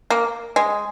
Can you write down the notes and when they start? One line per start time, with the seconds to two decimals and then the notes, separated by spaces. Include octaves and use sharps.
0.10 A#3
0.56 G#3